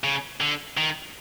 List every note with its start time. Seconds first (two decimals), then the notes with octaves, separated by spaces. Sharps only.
0.04 C#3
0.40 D3
0.77 D#3